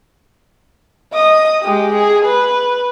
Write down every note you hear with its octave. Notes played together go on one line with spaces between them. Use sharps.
D#5 D#6
G#3 G4
G#4
B4